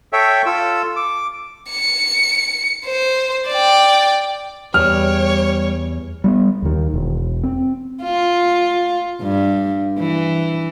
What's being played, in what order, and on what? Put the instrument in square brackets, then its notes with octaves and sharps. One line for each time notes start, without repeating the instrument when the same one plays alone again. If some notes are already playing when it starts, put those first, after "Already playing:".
[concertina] A4 C#5 E5 G5
F4 A4 E6
D6
[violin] C#7
C5
D5 G5
[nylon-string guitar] E2 [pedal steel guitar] G3 [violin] C#5 [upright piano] F6
[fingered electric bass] G3 A#3 B3
D#2 D#3
E1
C4
[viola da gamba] F4
G2
E3